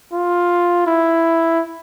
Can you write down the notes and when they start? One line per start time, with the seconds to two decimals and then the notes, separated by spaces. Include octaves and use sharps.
0.12 F4
0.87 E4